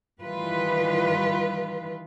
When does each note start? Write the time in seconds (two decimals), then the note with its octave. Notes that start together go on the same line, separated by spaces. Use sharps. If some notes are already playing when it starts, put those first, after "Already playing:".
0.20 D#3 E3 G3 F4 B4